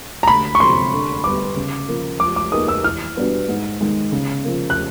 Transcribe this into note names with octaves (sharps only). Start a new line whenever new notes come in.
A#5
D2 B5
C#6
C3 F3 A3 C4 C6
D3
G3 B3 D6
C#3
F3 A#3
F3 D6
D6
A#3 D#4 G#4 B4 D#6
E6
E3 F6
G3 B3 D4 F#4
G#2
D#3 G#3
C#3
F3 A#3
F#6